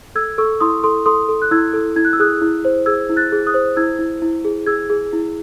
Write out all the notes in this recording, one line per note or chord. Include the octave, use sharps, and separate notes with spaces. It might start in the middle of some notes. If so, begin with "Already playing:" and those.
A4 E6 G#6
A4 C#6 E6
E4 C6 D#6
A4 C6 D#6
A4 C6 D#6
A4
F#6
E4 E6 G#6
A4
E4 G#6
F#6
E6
G#4 D#6 F#6
E4
C5
G#4 E6 G#6
E4
F#6 A6
G#4
D#6 F#6
C5
E4 E6 G#6
E4
E4
G#4
G#4 E6 G#6
G#4
E4